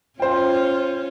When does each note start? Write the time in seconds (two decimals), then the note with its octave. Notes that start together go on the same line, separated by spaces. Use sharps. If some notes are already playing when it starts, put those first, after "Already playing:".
0.20 C#4 F4 C5 G5